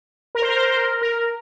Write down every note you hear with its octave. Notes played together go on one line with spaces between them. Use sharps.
A#4
C5
A#4
C5
A#4
C5
A#4
A#4